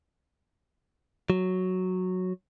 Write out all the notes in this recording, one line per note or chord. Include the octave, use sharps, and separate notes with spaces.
F#3